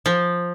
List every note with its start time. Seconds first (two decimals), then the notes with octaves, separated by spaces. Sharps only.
0.06 F3